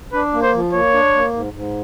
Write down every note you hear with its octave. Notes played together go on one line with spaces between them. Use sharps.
D4 B4
A#3
C5
F3
A#3 C#5
D4
A#3
G#2
G#2